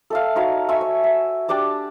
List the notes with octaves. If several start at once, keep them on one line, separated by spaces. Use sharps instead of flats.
A4 E5 F5
D#4 F#4 C#5 F5
E5 G#5 C#6
C#5
E5
D4 G4 D5 A5